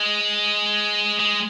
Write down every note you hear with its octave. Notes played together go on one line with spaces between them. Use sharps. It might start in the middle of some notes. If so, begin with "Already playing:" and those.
Already playing: G#3
G#3